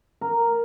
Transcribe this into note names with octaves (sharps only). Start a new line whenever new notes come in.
A#4